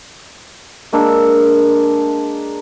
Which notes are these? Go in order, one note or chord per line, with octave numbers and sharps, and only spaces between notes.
G#3 A#3 D4 E6